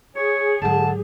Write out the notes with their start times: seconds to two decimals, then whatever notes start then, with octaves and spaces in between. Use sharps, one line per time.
0.16 G#4 C#5
0.62 G#2 D3 F#3 A5